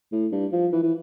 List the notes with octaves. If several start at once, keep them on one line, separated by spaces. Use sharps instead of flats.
A2
G2
F3
E3
E3